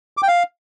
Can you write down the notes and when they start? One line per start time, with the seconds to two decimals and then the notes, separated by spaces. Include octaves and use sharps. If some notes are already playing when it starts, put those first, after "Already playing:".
0.17 D6
0.23 G5
0.28 F5